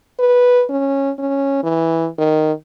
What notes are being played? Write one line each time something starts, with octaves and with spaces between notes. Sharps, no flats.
B4
C#4
C#4
E3
D#3